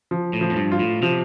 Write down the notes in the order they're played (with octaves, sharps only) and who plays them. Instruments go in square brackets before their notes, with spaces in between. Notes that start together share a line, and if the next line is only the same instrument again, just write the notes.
[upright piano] F3
[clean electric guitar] A2
[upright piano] F3
[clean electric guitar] F2
G2
[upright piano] F4
[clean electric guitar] A2
[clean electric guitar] C3 [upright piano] F3